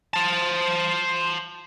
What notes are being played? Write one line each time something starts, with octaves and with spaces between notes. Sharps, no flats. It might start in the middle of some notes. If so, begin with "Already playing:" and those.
C5 A5